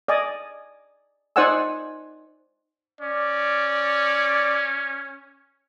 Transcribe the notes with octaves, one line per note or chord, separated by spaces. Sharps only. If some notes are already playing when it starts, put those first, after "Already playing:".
D5 D#5 G#5
D#4 C5 D5 F#5 G#5 E6
C#4 D5